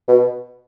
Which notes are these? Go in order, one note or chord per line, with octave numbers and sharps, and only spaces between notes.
B2